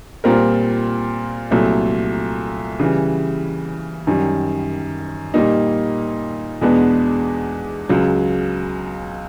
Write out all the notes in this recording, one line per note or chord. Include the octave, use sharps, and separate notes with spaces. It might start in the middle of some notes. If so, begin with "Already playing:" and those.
A#2 G3 C4 F4 A#4
C2 A#2 F#3 A3
C#3 E3 G3
F#2 D#3 G3
A#2 G3 A#3 D#4
E2 B2 G#3 B3 D4
C#2 C#3 F#3